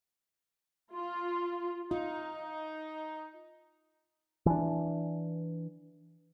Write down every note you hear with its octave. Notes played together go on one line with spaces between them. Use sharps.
F4
D#4 F4
E3 D4